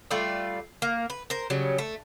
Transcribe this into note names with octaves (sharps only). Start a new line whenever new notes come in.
G3 A3 F4 D5
A#3
B4
A#4 C5
C#3 F#3 G3
A3